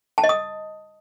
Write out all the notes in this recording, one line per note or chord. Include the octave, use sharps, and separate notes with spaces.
A5
D#5
D#6